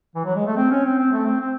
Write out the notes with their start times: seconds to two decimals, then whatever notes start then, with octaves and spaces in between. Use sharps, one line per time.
0.15 E3
0.25 F#3
0.36 G#3
0.47 A3
0.57 C4
0.71 C#4
0.85 C4
0.98 C4
1.12 A3
1.26 C4
1.40 C4